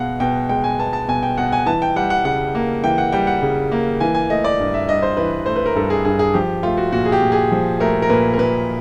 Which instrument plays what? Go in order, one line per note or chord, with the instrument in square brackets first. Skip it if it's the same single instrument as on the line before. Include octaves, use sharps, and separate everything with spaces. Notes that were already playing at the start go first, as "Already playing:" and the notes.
Already playing: [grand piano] B2 G#3 B3 F5 F#5
B2 G5
G#3 G5
G#5
B3 A5
A5
B2 G#5
G5
B2 F#5
G#5
E3 A5
G5
G3 F#5
F#5
C#3 F#5
A#3
E3 G5
F#5
G3 G5
F#5
C#3
A#3
E3 G#5
G#5
A3 D#5
D5
G2
E5
G2 D#5
C5
E3 B4
A3 C5
B4
A#4
G2 A4
G#4
G2 G#4
G#4
F3 G4
A3 F4
F#4
A#2 F#4
G#4
G4
A#2
G#4
F3
A3 A#4
A#4
A#2 B4
A#4
A#2 B4